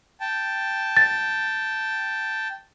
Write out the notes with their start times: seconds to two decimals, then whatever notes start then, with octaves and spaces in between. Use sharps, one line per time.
0.20 G5 A5
0.97 A6